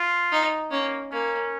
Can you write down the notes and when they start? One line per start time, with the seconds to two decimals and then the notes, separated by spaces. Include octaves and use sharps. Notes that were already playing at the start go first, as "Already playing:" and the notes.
Already playing: F4
0.32 D#4
0.71 A#3 C#4
1.12 A#3 C#4